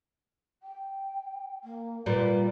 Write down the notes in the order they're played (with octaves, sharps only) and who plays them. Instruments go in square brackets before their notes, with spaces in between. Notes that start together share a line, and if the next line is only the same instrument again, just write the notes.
[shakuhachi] G5
A#3
[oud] A#2 G3 [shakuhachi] B4